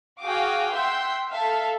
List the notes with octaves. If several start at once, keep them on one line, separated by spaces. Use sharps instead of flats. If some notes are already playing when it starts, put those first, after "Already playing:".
F#4 G#4 F5 G5 D6 D#6
E5 F#5 G5 C6 E6 G6
A4 E5 F5